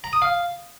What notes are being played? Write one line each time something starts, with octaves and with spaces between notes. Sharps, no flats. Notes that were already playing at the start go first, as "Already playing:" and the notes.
A#5
D#6
F5